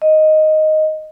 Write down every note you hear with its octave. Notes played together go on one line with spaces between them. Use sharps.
D#5